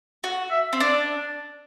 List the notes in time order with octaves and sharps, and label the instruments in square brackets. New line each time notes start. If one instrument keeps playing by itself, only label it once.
[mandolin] F#4
[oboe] E5
[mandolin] C4
[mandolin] D4 [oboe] D5